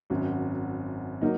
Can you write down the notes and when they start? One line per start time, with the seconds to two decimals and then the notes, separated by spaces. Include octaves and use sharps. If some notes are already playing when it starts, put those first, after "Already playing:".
0.10 G#1 F#2 F#3
1.21 F#3 A#3 D#4